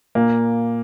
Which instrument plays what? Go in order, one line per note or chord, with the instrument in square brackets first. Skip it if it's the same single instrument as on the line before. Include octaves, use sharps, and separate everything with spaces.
[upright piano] A#2 A#3